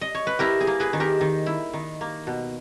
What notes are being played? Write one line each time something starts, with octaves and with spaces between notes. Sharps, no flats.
D#5
C#5
B4
E4 G4 A#4
G#4
A#3
G#4 B4
D#3
G4 A#4
D#3
E4
D#3
A#3
B2